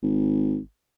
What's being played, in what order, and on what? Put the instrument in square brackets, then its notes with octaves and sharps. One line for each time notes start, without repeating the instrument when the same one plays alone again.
[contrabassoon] G#1